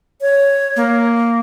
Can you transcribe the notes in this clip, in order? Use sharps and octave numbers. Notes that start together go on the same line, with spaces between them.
C#5
A#3